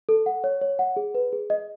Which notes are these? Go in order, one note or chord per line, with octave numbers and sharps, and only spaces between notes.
A4
F#5
C#5
C#5
F#5
G#4
B4
G#4
D#5